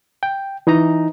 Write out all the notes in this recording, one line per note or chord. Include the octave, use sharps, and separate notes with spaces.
G5
E3 D#4 D#5 A#5